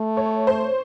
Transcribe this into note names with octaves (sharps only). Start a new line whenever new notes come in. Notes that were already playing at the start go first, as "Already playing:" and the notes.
Already playing: A3
C#5
C5